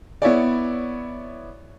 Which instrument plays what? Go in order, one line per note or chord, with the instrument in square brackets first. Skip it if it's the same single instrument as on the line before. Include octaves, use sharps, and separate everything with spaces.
[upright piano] B3 E4 C#5 D5